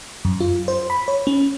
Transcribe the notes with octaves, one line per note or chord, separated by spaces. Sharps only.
F#2
F4
C5
B5
C#5
C#4